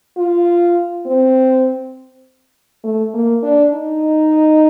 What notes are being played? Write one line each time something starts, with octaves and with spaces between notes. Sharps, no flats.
F4
C4
A3
A#3
D4
D#4